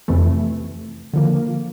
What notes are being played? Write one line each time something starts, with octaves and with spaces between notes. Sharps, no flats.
F2 C3 E3 A3
D3 F3 A#3